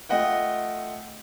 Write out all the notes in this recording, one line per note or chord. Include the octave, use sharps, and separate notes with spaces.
A3 F4 D#5 F#5 G5